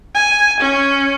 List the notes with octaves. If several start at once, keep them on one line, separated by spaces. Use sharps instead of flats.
G#5
C#4